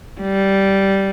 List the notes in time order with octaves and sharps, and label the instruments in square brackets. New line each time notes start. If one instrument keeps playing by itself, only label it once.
[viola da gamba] G3